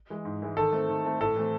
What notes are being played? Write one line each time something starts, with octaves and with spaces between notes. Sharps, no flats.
E3 G#3
G#2
E3 G#3
D#3 A4
A3 C4
D#3
A3 C4
A2 A4
E3 A3 C4